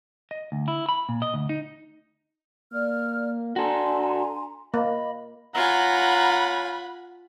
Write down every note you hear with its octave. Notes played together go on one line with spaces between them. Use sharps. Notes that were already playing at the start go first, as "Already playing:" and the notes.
D#5
D2
E4
B5
A#2
D#5
D2
D#4
A#3 D5 F6
D4 F#4 A4 G#5 A#5 C6
A#3 D#5 B5
F4 C#5 F#5 G#5 A#5 B5